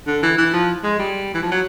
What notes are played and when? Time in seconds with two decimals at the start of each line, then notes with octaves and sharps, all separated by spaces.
0.07 D3
0.23 E3
0.38 E3
0.53 F3
0.83 G#3
0.99 G3
1.34 E3
1.42 F3
1.51 F#3